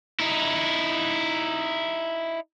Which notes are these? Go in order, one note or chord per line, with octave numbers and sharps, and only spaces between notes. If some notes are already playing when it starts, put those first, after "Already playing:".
D#4 E4